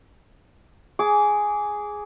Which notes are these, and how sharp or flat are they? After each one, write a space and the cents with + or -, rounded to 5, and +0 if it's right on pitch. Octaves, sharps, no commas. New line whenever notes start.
G#4 +0 D6 -20